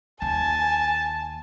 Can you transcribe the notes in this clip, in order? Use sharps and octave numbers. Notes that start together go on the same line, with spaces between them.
D#2 G#5 A5